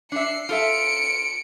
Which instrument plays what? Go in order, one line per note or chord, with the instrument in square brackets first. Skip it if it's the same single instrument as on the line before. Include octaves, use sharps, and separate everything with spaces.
[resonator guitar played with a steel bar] D4 E5 [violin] C7 C#7
[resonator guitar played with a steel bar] F4 A4 E5 [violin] C#7 D7